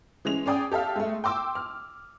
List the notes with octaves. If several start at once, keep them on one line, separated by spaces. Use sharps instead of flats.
E3 G#3 C#4 F7
C#4 G#4 D5 G5 D#6
G4 A4 E5 F5
G#3 A3
G5 C6 D6 E6
F6